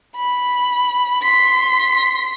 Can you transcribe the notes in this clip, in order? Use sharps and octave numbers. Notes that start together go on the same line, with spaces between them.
B5
C6 B6